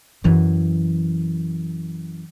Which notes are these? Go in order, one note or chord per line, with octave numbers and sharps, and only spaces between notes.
F#2 E3